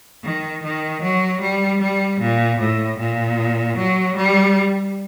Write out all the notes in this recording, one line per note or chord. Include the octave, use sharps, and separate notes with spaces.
D#3
D#3
F#3
G3
G3
A#2
A2
A#2
F#3
G3